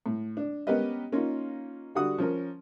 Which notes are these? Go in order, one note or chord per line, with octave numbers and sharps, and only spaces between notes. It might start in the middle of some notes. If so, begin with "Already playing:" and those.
A2
D4
B3 C#4 G4 A#4 B4 D#5
A#3 C#4 D#4 F4 A#4
D3 G3 F#4 F#5 D#6
F3 C#4 A#4